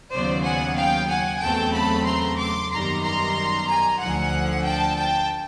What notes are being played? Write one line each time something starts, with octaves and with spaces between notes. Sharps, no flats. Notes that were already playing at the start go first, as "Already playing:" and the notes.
D#2 C#3 F#3 B3 C5 D5
F#5 G#5
F5 G5
F#5 G#5
E2 C#3 F#3 A3 C4 G5 A5
A5 B5
A#5 C6
C6 D6
F#2 D#3 G3 B3 A#5 C6
A#5 C6
G#5 A#5
D2 D3 F3 F#5 G#5
G5 A5
G5 A5